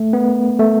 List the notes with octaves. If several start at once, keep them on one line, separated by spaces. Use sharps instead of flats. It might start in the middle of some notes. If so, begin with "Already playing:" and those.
Already playing: A3
B3
A3